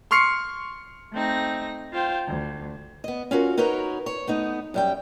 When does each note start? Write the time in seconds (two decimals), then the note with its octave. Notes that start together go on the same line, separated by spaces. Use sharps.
0.11 C6 C#6 F6 C7 C#7
1.13 A3 C4 D#4 A#6
1.92 F4 C5 F5 G5
2.28 D2
3.04 B3 D#5
3.31 C#4 F4 F#4 A#4
3.58 D#4 F#4 A#4 B4 C#5
4.06 C#5
4.27 A3 B3 D#4
4.74 F#2 G3 G5